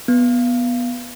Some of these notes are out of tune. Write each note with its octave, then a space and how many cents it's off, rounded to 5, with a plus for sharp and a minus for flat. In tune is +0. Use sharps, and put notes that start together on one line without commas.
B3 -10